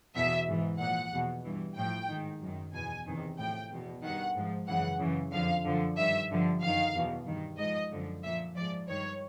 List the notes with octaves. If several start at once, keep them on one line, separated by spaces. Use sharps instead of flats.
E2 B2 E5
G#2 E3
A#2 F3 F#5
E2 B2
G2 E3
A2 F3 G5
G#2 D#3
F#2 D#3
E2 B2 G#5
E2 C3 D#3
A2 F3 G5
E2 B2
G2 D#3 F#5
G#2 F3
F#2 C#3 E3 F#5
F#2 C#3 E3
F2 D3 F3 F5
F#2 D3 F3
G2 D#3 E5
G2 D3 F3
F#2 D#3 F5
E2 B2
G2 D#3
G#2 F3 D#5
F#2 D3 F3
A#2 F3 E5
G#2 F3 D5
G2 D#3 C#5